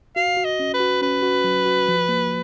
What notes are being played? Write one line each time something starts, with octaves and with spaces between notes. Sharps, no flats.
F#4 F5
F#4
D#5
C#4
B4
F#4
C#4 B4
F#4
F#3
F#4
F3
A#3